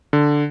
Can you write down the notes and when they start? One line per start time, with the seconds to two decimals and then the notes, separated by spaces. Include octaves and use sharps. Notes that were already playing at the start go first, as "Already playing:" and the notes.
0.13 D3